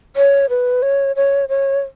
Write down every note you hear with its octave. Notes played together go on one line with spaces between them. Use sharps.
C#5
B4
C#5
C#5
C#5